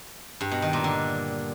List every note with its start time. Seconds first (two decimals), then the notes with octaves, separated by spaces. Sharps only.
0.41 G2
0.51 B2
0.62 D#3
0.73 A#2
0.84 D3